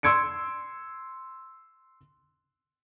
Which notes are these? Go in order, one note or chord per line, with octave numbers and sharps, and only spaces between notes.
C6 E6 G#6 C#7 D7